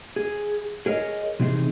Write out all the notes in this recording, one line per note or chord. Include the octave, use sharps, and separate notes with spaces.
G#4
G#4 A#4 C#5 D#5
C3 E3 C4 D#4 G#4